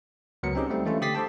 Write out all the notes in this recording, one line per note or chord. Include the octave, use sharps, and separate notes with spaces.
C#2 F#3 B3 A#4 C#7
C4 C#4 D#4 G4 G#4
G3 A3 C4
E3 G#3 A3 C#4 E4 F4
D3 G4 D#6 A6 B6 C7
G4 A4 C5 G5 A5